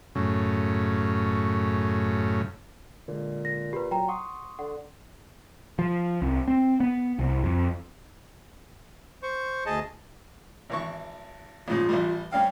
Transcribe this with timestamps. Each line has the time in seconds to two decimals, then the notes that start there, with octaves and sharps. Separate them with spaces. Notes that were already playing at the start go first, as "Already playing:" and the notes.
0.15 F#2 A2 C#3
3.08 A#2 D3 G#3
3.45 A#6
3.73 G4 B4 A#5 B5
3.91 F#3 G5 A#5
4.08 F#5 C6 C#6 D#6
4.59 D3 F#5
5.79 F3
6.22 C2
6.48 C4
6.80 B3
7.19 C2
7.44 F2
9.23 C5 C#6
9.66 D2 G#4 D#5 A5
10.70 G#1 E3 C#6
11.68 A#1 G#2 C#3 F4
11.89 A1 E3 G3
12.32 G3 C#4 F5 G5